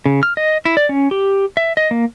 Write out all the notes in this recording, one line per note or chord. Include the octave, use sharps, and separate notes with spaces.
C#3
F6
D#5
E4
D5
C#4
G4
E5
D#5
A#3